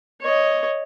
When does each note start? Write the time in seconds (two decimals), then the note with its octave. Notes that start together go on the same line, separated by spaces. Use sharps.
0.22 C#5 D#5